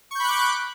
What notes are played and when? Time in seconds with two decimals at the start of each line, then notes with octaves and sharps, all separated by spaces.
0.11 C#6
0.15 G6
0.20 B5
0.24 F#6
0.29 D6